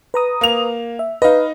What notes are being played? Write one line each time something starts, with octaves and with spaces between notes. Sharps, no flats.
B4 A#5 D#6
A#3 F7
E5
D#4 B4 D#5 F5